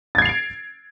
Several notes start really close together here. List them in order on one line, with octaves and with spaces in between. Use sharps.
A6 G#6 C7 F7 D7